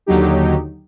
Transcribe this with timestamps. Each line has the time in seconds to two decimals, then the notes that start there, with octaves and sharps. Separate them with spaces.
0.06 D#2 D3 F#3 D#4 G4